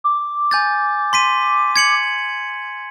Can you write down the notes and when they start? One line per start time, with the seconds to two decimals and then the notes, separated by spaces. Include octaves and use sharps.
0.04 D6
0.51 G#5 G6 A6
1.13 C6 B6 D#7
1.76 G#6 C#7 F#7